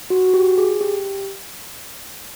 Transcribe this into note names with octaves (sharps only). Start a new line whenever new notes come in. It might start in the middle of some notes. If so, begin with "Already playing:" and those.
F#4
F#4
G4
G#4
G4